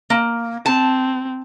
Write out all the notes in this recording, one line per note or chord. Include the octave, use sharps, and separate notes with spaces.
A#3
C4 A5